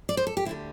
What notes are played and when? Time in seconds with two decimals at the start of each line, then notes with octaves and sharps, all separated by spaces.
0.09 D5
0.17 C5
0.27 A4
0.37 G4
0.45 D2 E4
0.49 D3 G3